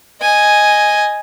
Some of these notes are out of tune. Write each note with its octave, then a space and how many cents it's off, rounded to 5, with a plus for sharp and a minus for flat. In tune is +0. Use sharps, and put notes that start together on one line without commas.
D#5 +0 G#5 +0